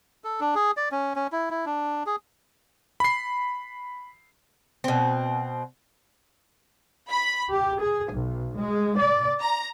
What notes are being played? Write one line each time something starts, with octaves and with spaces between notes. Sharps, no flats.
A4
D4
G#4
D5
C#4
C#4
E4
E4
D4
G#4
B5 C7
B2 C4
B5
G4
G#4
B1
G#3
D5
A#5